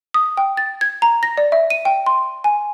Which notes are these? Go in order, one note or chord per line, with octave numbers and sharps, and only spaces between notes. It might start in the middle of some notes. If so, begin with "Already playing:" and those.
D#6
G5
A6
G#6
A#5
A#6
D5
E5
D#7
G5
C6
G#5